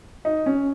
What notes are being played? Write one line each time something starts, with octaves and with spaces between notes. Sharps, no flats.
D#4
C#4